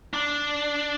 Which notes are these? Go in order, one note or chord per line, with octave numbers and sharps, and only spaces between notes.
D4